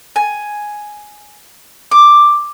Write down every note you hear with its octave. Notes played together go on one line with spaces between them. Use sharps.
G#5
D6